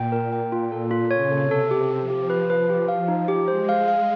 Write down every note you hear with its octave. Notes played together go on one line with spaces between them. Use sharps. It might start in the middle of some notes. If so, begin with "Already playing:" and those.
Already playing: A#2 G5
A#4
G5
A#2 F4
A4
F4
C#3 C#5
A4
C3
A4
C3 G4
G4
F3
G4
B4
B4
G4
F5
D#4
G4
G#3 C5
F5
F5